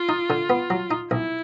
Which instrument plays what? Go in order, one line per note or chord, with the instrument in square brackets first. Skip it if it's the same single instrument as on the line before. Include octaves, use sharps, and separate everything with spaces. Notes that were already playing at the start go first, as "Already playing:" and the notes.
Already playing: [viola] F4
[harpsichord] D#4
D3
B3
F#3
D#4
[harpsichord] B1 [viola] E4